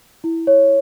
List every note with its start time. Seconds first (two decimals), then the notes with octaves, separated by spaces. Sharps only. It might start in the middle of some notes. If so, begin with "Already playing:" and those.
0.24 E4
0.47 C#5